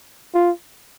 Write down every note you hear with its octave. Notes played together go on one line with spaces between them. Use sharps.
F4